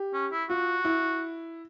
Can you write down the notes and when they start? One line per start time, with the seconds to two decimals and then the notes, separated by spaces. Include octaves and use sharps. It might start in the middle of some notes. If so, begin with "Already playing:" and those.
Already playing: G4
0.13 C#4
0.32 E4
0.50 F4 F#4
0.85 E4